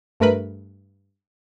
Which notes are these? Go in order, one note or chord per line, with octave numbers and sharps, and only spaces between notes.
G2 A3 A#4 B4 B5